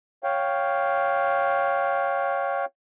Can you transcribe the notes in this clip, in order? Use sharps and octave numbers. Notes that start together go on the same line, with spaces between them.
C#5 F5 G5